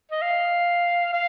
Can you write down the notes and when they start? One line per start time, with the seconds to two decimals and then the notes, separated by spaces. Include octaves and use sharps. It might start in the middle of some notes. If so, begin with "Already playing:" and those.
0.11 D#5
0.22 F5
1.13 F5